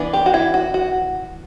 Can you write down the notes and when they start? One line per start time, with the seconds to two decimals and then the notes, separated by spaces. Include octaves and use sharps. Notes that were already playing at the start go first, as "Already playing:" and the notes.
Already playing: E3 B3 D4
0.13 G4
0.26 F#4
0.34 E4
0.54 F#4
0.74 F#4